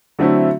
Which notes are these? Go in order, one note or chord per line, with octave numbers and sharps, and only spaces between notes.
D3 F#3 A3 C4 E4